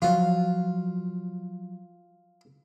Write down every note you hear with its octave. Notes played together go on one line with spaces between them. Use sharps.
F3 F#3 F4